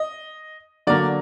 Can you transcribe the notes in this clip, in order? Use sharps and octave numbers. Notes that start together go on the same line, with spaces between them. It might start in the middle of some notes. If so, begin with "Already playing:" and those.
Already playing: D#5
D3 F#3 A#3 D5